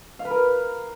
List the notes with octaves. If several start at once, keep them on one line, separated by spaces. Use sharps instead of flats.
F5
B4
A#4